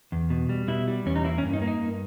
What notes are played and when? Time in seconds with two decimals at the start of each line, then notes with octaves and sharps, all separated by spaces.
0.12 E2
0.30 B2
0.49 G3
0.68 B2 E4
0.88 G3
1.06 E2 C#4
1.16 D#4
1.24 A#3 E4
1.38 C#4
1.44 G2
1.53 D#4
1.62 A#3
1.67 D#4
1.81 G2